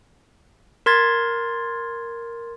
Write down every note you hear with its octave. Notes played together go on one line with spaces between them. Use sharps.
A#4 C6 G#6 A6